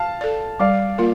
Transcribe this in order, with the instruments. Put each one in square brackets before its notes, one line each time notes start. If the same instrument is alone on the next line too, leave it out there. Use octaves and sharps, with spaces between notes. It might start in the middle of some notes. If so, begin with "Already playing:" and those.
Already playing: [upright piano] F5 A5
[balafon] A4 D5
[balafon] G3 [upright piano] D5 F5
[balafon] A#3 F4 A#4